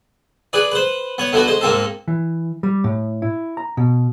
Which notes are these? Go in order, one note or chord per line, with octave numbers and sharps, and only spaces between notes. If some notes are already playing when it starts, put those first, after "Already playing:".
G#4 B4 D5
B4 C5
B3 C#5
D3 A3 B3 F#4
G#3 C5
G#2 A#3 C4 A4
E3
G3
A2
E4
A#5
B2